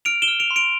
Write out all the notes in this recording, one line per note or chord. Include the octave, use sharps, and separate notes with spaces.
F6 D7 F7
E7 G7
F6
D7 F7
C6
D7 F7